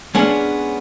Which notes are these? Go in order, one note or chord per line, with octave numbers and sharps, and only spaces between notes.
G#3 B3 C#4 D4